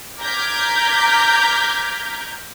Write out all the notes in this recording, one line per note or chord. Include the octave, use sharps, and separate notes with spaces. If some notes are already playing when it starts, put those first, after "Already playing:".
A#5 D6 F6 G6 G#6 B6